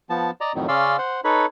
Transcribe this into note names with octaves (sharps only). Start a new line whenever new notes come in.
F3 B3 A5
D5 D#5 A#5
F2 A2 D#3 F#3
C#3 C#4 D5 F5 C6 E6
C5 F#5
D#4 A4 B4 C#5 B5